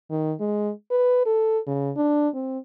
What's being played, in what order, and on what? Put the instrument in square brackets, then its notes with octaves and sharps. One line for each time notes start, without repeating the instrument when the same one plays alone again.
[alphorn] D#3
G#3
B4
A4
C#3
D4
C4